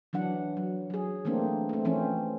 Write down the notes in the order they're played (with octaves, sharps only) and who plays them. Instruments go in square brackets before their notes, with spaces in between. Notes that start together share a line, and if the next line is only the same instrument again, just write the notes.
[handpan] E3 F#3 D4 F#5
F#3
F#3 G#4
E3 A3 A#3 C4 D4
A3 C4
E3 F3 C4 C#4